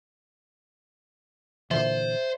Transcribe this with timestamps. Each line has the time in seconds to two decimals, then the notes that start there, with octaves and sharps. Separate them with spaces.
1.71 A#2 D3 E3 C5 E5